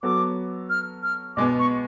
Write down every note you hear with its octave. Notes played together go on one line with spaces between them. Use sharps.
F#3 B3 F#4 A4 D6
F6
F6
B2 G#3 B3 D6
C#6